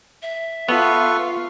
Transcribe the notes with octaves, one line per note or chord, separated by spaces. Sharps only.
E5
B3 F4 A4 B4 C#6